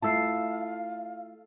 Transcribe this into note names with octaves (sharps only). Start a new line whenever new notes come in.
A3 E4 F4 F5 A5 E6 C7